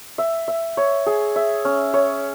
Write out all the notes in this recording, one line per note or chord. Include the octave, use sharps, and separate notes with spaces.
E5
E5
C#5
G#4
E5
C#4
C#5